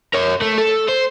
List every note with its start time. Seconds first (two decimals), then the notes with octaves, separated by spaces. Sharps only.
0.14 A#4 C#5
0.42 A3
0.58 A4
0.89 C5